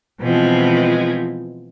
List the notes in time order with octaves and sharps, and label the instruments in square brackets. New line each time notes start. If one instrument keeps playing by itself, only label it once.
[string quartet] B2 E3 F3 G#3 C4